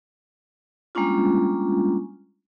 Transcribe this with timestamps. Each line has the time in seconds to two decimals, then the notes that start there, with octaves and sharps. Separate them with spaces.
0.95 G3 G#3 A#3 C#4 D4 F4